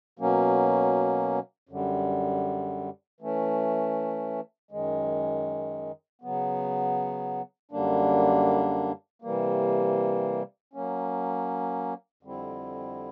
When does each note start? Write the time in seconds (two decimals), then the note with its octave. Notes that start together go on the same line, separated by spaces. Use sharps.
0.19 B2 F#3 A#3 C#4
1.69 F#2 D3 G3
3.21 E3 A3 C#4
4.71 F#2 D#3 G#3
6.22 C#3 F#3 B3
7.71 F#2 D3 G3 A#3 D4
9.22 C3 E3 G3 A#3
10.73 F#3 A#3 C#4
12.23 F2 D3 G3 C4 E4